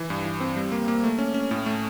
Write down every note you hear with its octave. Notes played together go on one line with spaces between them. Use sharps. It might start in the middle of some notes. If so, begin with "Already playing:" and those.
Already playing: E3
G2
E3
C4
G3
A#3
A#3
A3
C#4
C#4
A2
A3